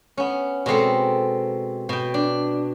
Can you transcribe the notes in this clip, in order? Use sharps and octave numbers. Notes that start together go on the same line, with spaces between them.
B3 C#4
B2 G#3 C4 A4
B2 G5
D4